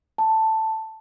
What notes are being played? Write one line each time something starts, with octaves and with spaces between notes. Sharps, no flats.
A5